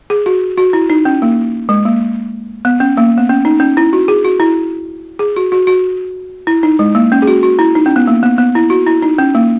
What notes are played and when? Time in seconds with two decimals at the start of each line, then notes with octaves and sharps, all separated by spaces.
0.10 G#4
0.26 F#4
0.58 F#4
0.73 E4
0.90 D#4
1.05 C#4
1.22 A#3
1.69 G#3
1.85 A#3
2.65 B3
2.80 C#4
2.97 A#3
3.18 B3
3.29 C#4
3.45 D#4
3.60 C#4
3.77 E4
3.93 F#4
4.08 G#4
4.24 F#4
4.40 E4
5.19 G#4
5.36 F#4
5.52 F#4
5.67 F#4
6.47 E4
6.63 D#4
6.79 G#3
6.95 A#3
7.12 C#4
7.22 G#4
7.27 F#4
7.43 F#4
7.59 E4
7.75 D#4
7.86 C#4
7.96 B3
8.07 A#3
8.23 B3
8.38 B3
8.55 E4
8.70 F#4
8.86 E4
9.02 D#4
9.18 C#4
9.35 A#3